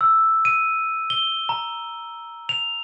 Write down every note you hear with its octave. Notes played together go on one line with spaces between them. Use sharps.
E6
D#7
G7
A#5
F7